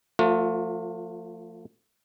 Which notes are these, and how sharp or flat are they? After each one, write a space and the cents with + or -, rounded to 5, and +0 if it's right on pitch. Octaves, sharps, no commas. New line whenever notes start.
F3 +0 A3 +35 F4 +35